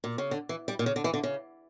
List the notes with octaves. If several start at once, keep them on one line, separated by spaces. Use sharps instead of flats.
A#2
C#3
D3
E3
G3
A#2
C#3
D3
E3
D3
C#3